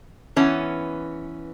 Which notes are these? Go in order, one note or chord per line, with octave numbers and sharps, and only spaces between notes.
E3 B3 C#4